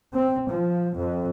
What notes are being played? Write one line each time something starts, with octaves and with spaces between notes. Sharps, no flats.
C4
F3
F2